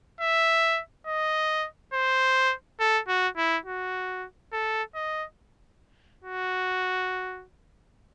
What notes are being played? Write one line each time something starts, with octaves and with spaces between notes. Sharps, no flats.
E5
D#5
C5
A4
F#4
E4
F#4
A4
D#5
F#4